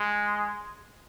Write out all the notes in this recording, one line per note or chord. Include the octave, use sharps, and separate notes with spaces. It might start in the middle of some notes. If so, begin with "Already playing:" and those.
Already playing: G#3